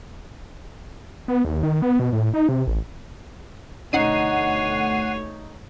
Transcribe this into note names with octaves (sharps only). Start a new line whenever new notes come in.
B3
D#2
D#3
B3
B2
A2
D#4
C3
A1
D2 B2 A3 D#4 C#5 F#5 C7 D#7